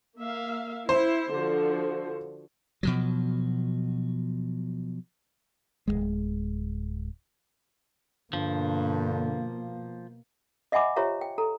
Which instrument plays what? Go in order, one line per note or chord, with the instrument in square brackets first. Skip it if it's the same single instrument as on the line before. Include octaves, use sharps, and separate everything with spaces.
[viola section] A#3 E5 F5
[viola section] E4 [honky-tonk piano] C5
[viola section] D3 F3 F#4
[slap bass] B2 F3 F#3
[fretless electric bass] D1 G#1 G#3
[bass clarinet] G2 [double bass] B2 A#3 [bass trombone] D3 [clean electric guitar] F3
[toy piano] D#5 E5 F#5 G#5 B5 D6
F4 G4 C5 C#5 E5 A#5
G5
A4 A#5